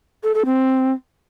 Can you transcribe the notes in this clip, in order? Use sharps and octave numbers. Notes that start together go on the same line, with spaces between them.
A4
A4
C4